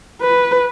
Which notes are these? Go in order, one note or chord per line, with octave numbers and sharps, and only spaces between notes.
B4